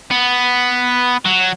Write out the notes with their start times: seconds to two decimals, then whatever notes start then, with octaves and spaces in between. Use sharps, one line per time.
0.11 B3
1.26 F#3